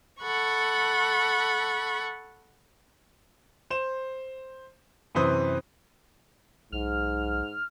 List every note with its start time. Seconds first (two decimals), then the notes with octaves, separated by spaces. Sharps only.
0.20 A4 F#5 B5 C#6
3.70 C5 E7
5.15 F#2 C3 E3 B4 C5 D#6
6.72 B1 G#2 F6